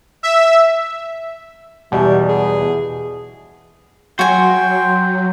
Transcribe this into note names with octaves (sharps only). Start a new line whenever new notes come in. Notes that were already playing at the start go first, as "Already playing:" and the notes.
E5
E2 B2 G3
G#4
F#3 F#4 G5 G#5 C6